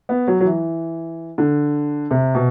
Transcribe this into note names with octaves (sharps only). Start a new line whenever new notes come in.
B3
F#3
F#3
E3
D3
C3
B2